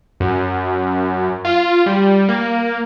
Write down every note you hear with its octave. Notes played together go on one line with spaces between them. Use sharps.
F#2
F4
G3
A#3